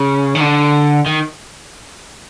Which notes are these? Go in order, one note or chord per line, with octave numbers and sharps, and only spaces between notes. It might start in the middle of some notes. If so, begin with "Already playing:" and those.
Already playing: C#3
D#3
D3
D#3